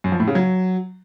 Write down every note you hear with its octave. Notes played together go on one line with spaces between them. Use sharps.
F#2
F3
A2
C#3
F#3